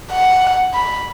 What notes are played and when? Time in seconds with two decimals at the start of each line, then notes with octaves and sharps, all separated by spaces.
0.12 F#5
0.74 B5